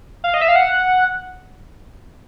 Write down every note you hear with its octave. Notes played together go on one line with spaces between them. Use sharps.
F5
D#5
E5
F5
F#5